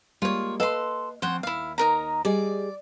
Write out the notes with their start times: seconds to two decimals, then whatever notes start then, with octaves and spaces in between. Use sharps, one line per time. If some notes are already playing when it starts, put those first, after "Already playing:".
0.22 G3 G#3 A#3 F4 C#5
0.60 A4 B4 D#5 F5 C6
1.22 F3 C4 C5 C#5 F#5
1.43 D#2 E4 F5
1.78 D#4 A#4 A#5
2.25 G3 G#4 D5 D#5